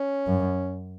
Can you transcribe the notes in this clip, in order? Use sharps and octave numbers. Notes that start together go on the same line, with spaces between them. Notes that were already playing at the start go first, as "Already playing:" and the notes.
Already playing: C#4
F#2